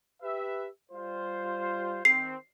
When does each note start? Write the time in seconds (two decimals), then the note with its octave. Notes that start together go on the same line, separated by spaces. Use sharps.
0.23 G4 B4 E5
0.92 G3 F4 C5
2.05 D#3 C4 C7